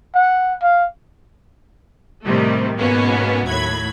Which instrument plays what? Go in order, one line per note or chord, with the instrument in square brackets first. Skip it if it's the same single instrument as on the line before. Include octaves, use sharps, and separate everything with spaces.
[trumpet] F#5
F5
[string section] A2 C3 D#3 G3 A3
G#2 B2 A#3 B3 C#4
D#2 A2 F#3 B5 G#6